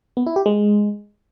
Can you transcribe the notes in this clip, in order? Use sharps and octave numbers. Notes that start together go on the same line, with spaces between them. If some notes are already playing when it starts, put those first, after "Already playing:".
B3
E4
G4
G#3